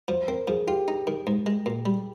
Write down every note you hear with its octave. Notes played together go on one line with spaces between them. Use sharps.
F3 C5
C4 A#4
F3 G#4
F4 G4
D#4
D#3
G#2
G#3
A#2
G3